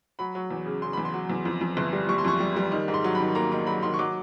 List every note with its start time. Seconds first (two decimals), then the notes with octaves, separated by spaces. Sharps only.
0.19 F#3 B5
0.35 F#3
0.50 E2
0.66 C#3
0.82 C#3 C6
0.93 E2 B5
1.05 C6
1.14 F#3
1.30 E2
1.45 F2
1.61 F2
1.77 G1
1.93 G3
2.09 G3 C#6
2.18 C6
2.25 F2 C#6
2.40 G3
2.56 G3
2.72 D#3
2.88 G#2
2.94 C6
3.04 F#3
3.15 B5
3.20 D#3
3.35 A#3 A#5
3.52 D#3 A#5
3.66 F#3 B5
3.83 D#3 C6
3.94 C#6
3.99 F#3 D6